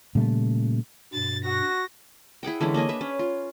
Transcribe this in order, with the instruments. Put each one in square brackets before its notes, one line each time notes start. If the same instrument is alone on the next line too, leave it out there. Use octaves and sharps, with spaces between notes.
[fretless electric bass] A#2 C#3 G3 A3
[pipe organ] G2 B2 [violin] A6
[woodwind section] F#4 [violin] A#6
[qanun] E4 G#4 F#5 G5
D3 E3 G#3 C#4
A#3 D4 D#5 G#5
B4 E5
C#4
F4